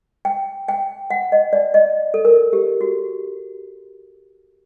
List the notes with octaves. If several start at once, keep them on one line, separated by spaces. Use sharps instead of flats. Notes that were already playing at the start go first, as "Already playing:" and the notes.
G5
G5
F#5
D#5
D5
D#5
A4
A#4
G4
F#4